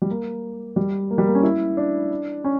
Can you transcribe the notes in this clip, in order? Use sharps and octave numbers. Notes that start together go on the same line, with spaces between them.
G3
A#3
G3
A#3
G3
A#3
C#4
E4
D4
C#4